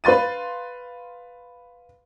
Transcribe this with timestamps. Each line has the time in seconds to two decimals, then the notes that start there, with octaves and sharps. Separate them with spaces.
0.04 B4 F5 C6 A6 D#7